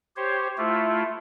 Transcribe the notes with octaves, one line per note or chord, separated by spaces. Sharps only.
G4 C5 C#5
A3 E4 F4